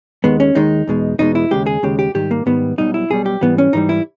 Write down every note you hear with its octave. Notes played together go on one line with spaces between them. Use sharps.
D#2 D#3 G#3 B3
C#4
D#2 D#3 G#3 D#4
E2 B2 G#3
E2 B2 G#3 D#4
E4
D#2 C#3 G#3 G4
G#4
D#2 C#3 G#3 G4
G4
G#2 D#3 G3 G4
A#3
G#2 D#3 G3 B3
B1 B2 G3 D#4
E4
B1 B2 G3 G#4
G4
G#2 E3 G3 B3
C#4
G#2 E3 G3 D#4
E4